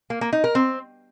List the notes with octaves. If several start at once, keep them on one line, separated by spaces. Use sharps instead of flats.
A#3
A#3
D#4
A#4
C4